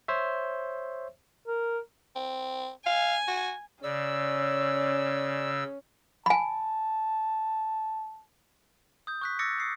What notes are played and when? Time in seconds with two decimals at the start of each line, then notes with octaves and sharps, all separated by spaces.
0.08 C5 C#5 E5
1.47 A#4
2.16 C4
2.86 F5 G#5
3.28 F#4
3.83 C#3 C#4 D5 E6
6.26 G#5 A5 B5
9.07 D#6 G6
9.22 C#6 F#6 B6
9.39 D6 E6 A6 A#6 C#7
9.58 D#6 C7 C#7